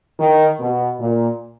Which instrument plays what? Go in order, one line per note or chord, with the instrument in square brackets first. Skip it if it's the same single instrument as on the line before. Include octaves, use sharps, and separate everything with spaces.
[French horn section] D#3
B2
A#2